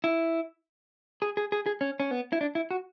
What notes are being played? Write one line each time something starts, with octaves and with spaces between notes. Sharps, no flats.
E4
G#4
G#4
G#4
G#4
C#4
C#4
B3
E4
D4
E4
F#4